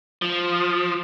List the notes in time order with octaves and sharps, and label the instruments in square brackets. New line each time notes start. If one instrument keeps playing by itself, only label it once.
[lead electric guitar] F3